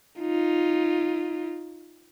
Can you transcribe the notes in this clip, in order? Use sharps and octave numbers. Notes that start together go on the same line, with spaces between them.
D#4 F4